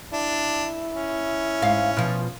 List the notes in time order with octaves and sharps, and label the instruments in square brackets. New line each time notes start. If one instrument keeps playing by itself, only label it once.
[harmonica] D4 [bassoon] E4
[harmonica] C#4
[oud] G#2 F5
B2 F3